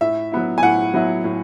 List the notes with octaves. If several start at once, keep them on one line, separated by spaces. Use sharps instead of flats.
A2 E5
F#3 B3 E4
G#5
A2 F#5
F#3 B3 E4
A2